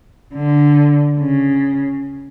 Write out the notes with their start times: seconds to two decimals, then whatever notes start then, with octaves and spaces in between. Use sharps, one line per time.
0.34 D3
1.19 C#3